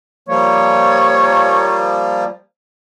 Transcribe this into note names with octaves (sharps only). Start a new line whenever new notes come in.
F3 G3 A#3 C#5